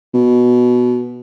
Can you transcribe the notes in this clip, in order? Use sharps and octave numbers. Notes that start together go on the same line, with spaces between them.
B2